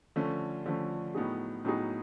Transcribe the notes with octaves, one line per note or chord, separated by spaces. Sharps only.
D3 F3 A3 C#4
D3 F3 A3 C#4
A2 F#3 B3 D#4 G#4
A2 F#3 B3 D#4 G#4